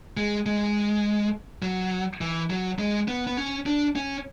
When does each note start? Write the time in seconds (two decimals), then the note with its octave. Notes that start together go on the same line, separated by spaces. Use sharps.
0.17 G#3
0.46 G#3
1.62 F#3
2.21 E3
2.50 F#3
2.79 G#3
3.08 B3
3.27 B3
3.37 C#4
3.66 D4
3.96 C#4